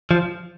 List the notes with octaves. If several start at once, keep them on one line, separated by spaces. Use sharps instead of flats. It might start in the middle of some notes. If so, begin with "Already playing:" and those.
F3